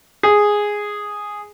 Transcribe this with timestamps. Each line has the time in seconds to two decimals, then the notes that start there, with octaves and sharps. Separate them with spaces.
0.23 G#4